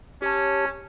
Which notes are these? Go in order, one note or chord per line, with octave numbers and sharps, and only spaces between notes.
C#4 G4 C#5 A5